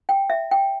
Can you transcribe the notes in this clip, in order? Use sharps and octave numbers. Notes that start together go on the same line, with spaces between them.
G5
E5
G5